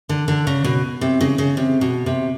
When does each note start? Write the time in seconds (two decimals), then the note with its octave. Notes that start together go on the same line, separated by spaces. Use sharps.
0.09 D3
0.28 D3
0.47 C#3
0.64 B2
1.01 C3
1.21 C#3
1.38 C#3
1.57 C3
1.81 B2
2.06 C3